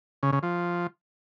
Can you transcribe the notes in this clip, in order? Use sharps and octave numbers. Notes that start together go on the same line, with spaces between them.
C#3
C#3
F3